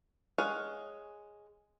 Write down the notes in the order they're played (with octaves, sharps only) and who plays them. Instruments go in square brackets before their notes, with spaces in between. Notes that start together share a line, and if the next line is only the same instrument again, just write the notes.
[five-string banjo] G#3 G#4 C#5 F5 F#5